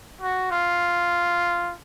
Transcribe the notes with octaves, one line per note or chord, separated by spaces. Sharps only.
F#4
F4